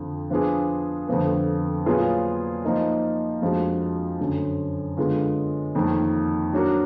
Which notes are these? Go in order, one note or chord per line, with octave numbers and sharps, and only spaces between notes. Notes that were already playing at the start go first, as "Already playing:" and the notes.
Already playing: F2 D3 F3
F3 B3 D4 F4 G#4
F2 D3 F3 B3
A#2 F#3 B3 F4 G#4
F3 A#3 D#4 A#4
F2 F3 G#3 D4 F#4
F#2 D3 F#3
D3 G#3 B3 F4
F2 D#3 A#3
F#3 D4 F#4 A#4